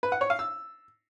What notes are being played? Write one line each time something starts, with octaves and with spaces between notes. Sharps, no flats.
B4
F#5
C#5
F5
E6